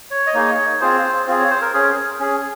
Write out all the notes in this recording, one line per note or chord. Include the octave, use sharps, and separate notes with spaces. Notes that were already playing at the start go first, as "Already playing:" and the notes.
C#5
D#5
A#3 D#4 G#4 C#5
C4 F4 G#4 C5
C4 F4 G#4
C#5
C5
A#4
C#4 G#4
C#4 G#4